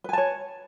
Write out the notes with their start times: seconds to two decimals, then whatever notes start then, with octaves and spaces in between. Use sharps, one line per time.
0.04 B4
0.09 G#5
0.13 A5
0.18 C#5